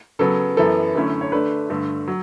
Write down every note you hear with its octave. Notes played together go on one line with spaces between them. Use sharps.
C#3 F#3 B3 A4
F#2 E3 B3 A4
F#2 D3 A3 C#4 E4
C#5
D3 A3 D4 B4
G2 D3 A3
F#3